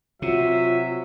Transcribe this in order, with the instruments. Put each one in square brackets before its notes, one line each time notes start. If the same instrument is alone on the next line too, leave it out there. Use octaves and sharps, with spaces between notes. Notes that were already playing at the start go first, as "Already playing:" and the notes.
[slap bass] C3 [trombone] F#3 [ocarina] F4 [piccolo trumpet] E5